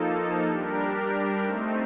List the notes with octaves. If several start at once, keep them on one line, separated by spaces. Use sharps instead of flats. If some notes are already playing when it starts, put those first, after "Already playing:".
Already playing: F3 A#3 D#4 A4
G3 D4 G4 A#4
A3 C4 D#4